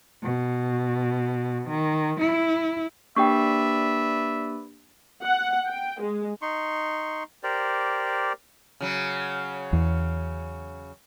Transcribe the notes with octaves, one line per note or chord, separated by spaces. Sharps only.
B2
D#3
E4
A#3 D4 G4 B4 D5 E5 G5 C#6
F#5
G5
G#3
D#4 C6 C#6
G4 A#4 C5 D5
C#3 F#3
E2